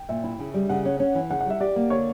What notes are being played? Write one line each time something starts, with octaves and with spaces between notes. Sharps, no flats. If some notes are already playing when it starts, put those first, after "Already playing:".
Already playing: G5
A#2 E5
E4
C#3
G3
C#3 F#5
C#4
C#4
E3
C#3 F#5
F#5
G3 E5
G4 D5
A#3
D3 C#5